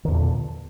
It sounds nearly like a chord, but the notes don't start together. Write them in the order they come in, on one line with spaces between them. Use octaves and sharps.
D#3 E2 A#2 D3